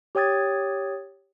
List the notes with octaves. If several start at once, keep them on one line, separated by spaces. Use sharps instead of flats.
G4 C#5 G5 D#6 G#6 A6